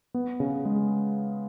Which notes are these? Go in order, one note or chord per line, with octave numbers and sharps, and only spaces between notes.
B3
C#3
G#3